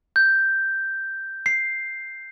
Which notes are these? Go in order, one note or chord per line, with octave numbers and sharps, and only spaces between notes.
G6
C7